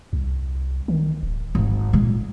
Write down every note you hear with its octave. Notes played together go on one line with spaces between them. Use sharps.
C2
D#3
D1
G#1 C4
A#2 G#3